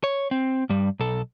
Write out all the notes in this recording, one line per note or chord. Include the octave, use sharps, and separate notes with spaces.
C#5
C4
G2 G3
B1 A4